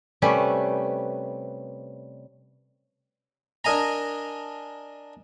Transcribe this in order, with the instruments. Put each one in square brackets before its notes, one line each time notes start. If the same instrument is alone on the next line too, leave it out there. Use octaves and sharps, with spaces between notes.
[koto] C3 G3 A3 C#4 G4 B4
[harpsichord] D4 A#4 D#5 G#5 A#5